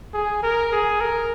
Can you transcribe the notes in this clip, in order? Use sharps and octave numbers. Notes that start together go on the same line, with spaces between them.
G#4
A#4
G#4
A#4